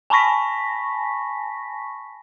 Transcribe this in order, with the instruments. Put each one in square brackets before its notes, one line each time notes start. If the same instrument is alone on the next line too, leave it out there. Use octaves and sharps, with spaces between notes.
[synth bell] G#5 A5 B5 C#6 A#6 B6